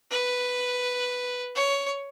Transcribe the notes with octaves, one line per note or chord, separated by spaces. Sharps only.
B4
C#5